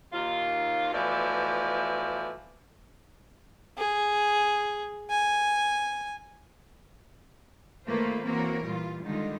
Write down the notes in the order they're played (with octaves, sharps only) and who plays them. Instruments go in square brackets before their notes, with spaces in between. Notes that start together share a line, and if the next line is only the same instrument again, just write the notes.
[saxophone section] D#2 F4
B2 E3 F3 A3 D5
[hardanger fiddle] G#4
G#5
[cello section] D#3 A3 A#3 F4 B4 C5
E3 A#3 C4 F#4 A#4 C#5
A#2 E3 G3 F4
D3 D#3 G3 G#3 D#4 F4